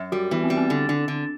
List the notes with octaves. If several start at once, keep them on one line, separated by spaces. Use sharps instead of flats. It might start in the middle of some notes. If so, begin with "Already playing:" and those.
Already playing: F#2
G3 F#4
E3 B3
C4
G3
C4
D3
D3
D3